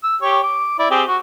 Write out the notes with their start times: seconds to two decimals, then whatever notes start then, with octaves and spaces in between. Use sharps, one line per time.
0.04 E6
0.22 G4 C#5
0.43 D6
0.79 E4 D5
0.91 C4 G4 G#4
1.08 F#4